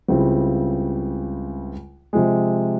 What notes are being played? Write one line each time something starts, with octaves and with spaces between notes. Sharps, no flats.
C#2 C#3 G3 C4 E4
C3 F3 G#3